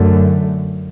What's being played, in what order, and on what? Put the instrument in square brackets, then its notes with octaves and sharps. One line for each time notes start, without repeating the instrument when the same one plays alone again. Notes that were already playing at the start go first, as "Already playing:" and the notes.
Already playing: [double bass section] F#2 D3 A3